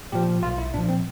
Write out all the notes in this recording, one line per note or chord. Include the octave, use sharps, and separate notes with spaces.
A#2 F3 G4
B1 F4
E4
A#2 F3 D4
C4